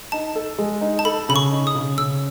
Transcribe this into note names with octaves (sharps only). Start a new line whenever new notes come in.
D#4 A5
A4
G#3
D#4
A5
A4 B5
C#3 B5
C#6
D#4
D#6
C#3
C#3 E6